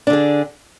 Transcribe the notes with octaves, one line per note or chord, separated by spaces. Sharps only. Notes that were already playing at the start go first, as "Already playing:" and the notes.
D3 D4 G#4